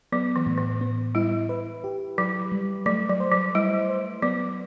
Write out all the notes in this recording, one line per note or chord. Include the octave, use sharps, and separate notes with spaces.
F#3 B3
E3
A2
E3
B3
G3 E4
B4
G4
F#3 B4
G3
F#3 A3
F#3
C5
F#3
G3 E4
C5
F#3 B3